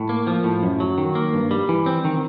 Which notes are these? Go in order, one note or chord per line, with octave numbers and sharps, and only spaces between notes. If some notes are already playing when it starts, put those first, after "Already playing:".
Already playing: A2
A#3
F3
A2
F#2
F#3
D#3
A#3
G2
G3
E3
C4
D#3